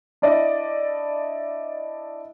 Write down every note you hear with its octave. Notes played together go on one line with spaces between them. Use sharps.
D4 E4 D5 D#5